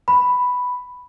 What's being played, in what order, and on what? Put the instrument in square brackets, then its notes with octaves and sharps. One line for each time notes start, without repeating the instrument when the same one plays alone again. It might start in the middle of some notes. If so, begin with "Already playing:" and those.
[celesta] B5